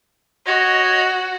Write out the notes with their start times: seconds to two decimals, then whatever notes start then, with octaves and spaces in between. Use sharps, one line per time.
0.46 F#4 C#5 D#5